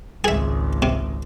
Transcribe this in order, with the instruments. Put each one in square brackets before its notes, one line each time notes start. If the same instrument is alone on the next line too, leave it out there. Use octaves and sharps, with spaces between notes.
[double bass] G#1 C#2 [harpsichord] G#4 E5
[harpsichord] C3